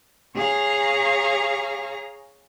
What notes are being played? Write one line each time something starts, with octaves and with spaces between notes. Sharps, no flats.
G#4 C#5 F5 A#5